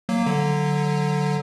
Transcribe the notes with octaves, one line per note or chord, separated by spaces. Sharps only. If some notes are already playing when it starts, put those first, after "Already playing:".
F#3 A#3
D3 F#3